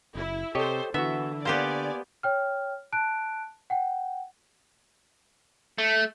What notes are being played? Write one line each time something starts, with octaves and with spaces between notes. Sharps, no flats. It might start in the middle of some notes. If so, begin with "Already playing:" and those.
F#1 E4
C3 G4 A4 C5 C#5 D#5
D3 E3 B3 F#4 E5
A#3 B3 G4 C5 D5 G#5
C#5 G5 F6
A5 F#6 D7
F#5 G5
A3